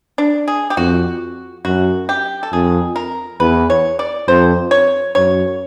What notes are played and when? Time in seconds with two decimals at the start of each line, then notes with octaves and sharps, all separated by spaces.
0.18 D4
0.48 G#4
0.70 G4
0.77 F2 F#4
1.65 F#2 F#4
2.09 G4
2.43 A4
2.52 F2 G#4
2.96 A#4
3.40 E2 B4
3.70 C#5
3.99 D5
4.27 F2 C5
4.71 C#5
5.15 F#2 C#5